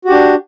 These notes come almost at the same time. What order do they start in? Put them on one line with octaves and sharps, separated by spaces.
F#4 G4 D4